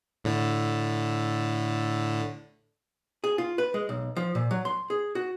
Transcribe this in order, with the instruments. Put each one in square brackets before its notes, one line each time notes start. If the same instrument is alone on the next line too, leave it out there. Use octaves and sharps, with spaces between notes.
[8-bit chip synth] A2 D3
[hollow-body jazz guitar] G#4
F4
B4
G#3
B1
F3
A#2
F#3
C6
G#4
F#4